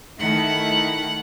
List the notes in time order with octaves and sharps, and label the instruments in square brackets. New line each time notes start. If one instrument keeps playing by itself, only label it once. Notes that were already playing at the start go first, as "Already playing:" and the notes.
[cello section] D#3 A3 E4 [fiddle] F#5